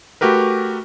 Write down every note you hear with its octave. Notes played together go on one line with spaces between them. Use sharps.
A3 F#4 G4 A#4 B4